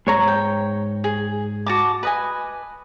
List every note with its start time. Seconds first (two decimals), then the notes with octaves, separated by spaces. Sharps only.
0.07 G#2 C#5 A#5
0.28 G5
1.04 G#4
1.66 F#4 A5 D6
2.03 B4 D#5 G#5